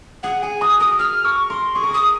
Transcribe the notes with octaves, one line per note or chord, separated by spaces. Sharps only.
G#4 F#5
G#4 G#5
F#4 D#6
A#4 D#6
G#4 F6
A#4 C#6
A#4 C6
G#4 C#6
A#4
G#4 D#6